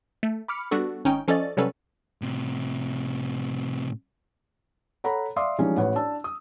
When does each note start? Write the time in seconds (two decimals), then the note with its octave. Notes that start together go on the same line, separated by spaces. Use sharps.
0.23 A3
0.48 B5 D6 F6 C#7
0.71 G3 B3 D4 F#4 A4
1.04 G#1 C#4 D#4 G5
1.28 F3 C#4 A4 D5 D#5 A6
1.57 C3 F#3 G3 C#4 A4 B4
2.22 A2 C3
5.04 A4 C#5 F#5 A#5 B5
5.36 D5 E5 F5 C6 D6 D#6
5.58 E3 F3 G3 G#3 C#4 D#4
5.77 A1 B4 C#5 F#5
5.95 D4 A5 E6
6.24 D#6